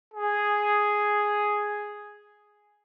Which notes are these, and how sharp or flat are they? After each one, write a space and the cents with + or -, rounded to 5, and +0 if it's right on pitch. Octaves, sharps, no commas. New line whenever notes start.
G#4 +0